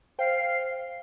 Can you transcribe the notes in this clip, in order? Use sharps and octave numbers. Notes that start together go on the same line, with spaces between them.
C5 F5 G5